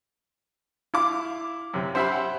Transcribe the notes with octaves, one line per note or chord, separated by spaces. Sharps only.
E4 F5 D6
F#2 C3
C#4 G4 C5 E5 F#5 B5